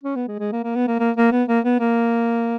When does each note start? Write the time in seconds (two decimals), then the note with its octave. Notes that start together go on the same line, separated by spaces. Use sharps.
0.03 C#4
0.15 B3
0.28 G#3
0.39 G#3
0.52 A#3
0.64 A#3
0.75 B3
0.88 A#3
1.00 A#3
1.17 A#3
1.32 B3
1.48 A#3
1.65 B3
1.80 A#3